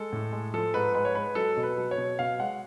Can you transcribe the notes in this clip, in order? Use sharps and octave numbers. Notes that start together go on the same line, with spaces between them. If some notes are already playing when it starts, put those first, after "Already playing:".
Already playing: G#3 A4
A2
G#3
F3 A4
G#2 B4
G#3 B4
C#5
G#3 B4
F#3 A4
B2
B4
F#3
C#5
B2
B2 F5
G#3 F#5